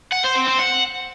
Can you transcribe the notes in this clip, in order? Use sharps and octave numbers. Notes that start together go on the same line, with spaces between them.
F#5
C5
C4
C4
F#5